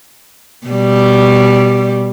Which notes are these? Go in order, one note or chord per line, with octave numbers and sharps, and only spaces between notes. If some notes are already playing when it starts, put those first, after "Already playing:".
B2 G3